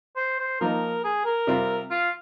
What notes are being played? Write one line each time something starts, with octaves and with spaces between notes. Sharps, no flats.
C5
C5
F3 A#3 D#4 A#4
G#4
A#4
C3 G3 C4 F4
F4